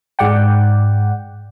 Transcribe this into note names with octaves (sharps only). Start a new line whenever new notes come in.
G#2 G#3 D5 F#5 G5